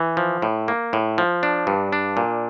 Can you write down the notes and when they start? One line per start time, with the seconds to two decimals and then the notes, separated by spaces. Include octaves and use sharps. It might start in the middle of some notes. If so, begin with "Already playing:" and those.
Already playing: E3
0.17 F3
0.42 A2
0.68 A#3
0.93 A2
1.18 F3
1.43 D4
1.67 G2
1.93 D4
2.17 A#2